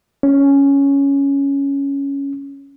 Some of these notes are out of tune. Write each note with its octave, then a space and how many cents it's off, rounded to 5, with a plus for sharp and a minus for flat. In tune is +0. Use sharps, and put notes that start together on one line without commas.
C#4 +5